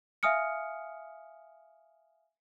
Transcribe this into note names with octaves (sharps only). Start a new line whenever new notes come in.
E5 F5 G#5 D#6 F6 C#7